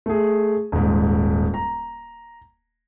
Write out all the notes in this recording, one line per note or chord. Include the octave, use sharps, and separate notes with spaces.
A3 G#4
D#1 G#2
A#5